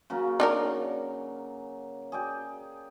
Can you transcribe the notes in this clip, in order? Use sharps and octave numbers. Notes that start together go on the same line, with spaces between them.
C#3 F#3 A#3
D4 D#4 A#4
G#4 D5 G5